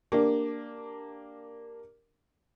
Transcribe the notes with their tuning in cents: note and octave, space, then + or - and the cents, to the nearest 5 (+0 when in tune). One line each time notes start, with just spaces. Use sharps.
A#3 -5 D4 +0 G4 +0